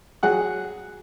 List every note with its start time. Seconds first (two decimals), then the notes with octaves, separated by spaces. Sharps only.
0.23 F#3 G#4 F#5 F#6